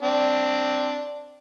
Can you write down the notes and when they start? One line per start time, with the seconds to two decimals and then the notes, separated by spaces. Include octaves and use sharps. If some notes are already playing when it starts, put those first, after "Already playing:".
0.03 C4 D4